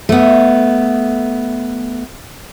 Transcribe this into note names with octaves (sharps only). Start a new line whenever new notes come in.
A3 B3